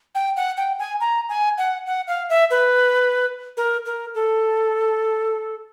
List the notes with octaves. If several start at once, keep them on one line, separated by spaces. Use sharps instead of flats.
G5
F#5
G5
G#5
A#5
G#5
F#5
F#5
F5
E5
B4
A#4
A#4
A4